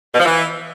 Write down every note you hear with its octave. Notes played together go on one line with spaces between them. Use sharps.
B2
F3
E3